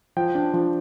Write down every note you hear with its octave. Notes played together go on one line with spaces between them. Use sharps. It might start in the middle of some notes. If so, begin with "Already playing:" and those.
F3 G5
D4
F3